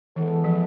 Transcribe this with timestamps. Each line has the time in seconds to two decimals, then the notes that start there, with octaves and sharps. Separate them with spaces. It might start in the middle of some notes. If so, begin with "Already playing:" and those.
0.16 E3 G#3 B3 E4 A4
0.44 F3